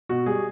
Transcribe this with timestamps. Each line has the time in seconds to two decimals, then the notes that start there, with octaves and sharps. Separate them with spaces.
0.09 B2 F#4
0.26 G3 G#4